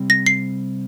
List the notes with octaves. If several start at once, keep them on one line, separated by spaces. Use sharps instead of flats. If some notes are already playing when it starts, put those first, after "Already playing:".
Already playing: C3 G3 C4
A#6
C7